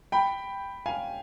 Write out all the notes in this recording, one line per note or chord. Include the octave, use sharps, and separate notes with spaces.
G5 B5
F5 G#5